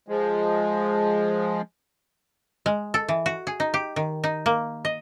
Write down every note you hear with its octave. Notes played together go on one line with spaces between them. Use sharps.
F3 G#3
G#3
A4
E3
F#4
G#4
D#4
G4
D#3
D#4
A#3
D#5